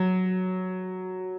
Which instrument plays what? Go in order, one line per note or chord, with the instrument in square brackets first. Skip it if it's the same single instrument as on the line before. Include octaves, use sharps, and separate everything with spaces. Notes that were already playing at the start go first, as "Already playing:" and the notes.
Already playing: [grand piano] F#3